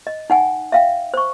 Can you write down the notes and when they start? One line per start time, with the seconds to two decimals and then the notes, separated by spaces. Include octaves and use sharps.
0.07 D#5
0.30 D#4 F#5 G#5
0.72 E5 F5 G5
1.14 C5 C#6